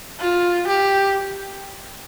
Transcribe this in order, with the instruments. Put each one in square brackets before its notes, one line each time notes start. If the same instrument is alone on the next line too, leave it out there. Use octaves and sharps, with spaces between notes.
[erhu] F4
G4